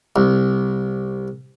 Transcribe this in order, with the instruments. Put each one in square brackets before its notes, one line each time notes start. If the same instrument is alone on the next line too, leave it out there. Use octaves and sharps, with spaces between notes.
[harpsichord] C2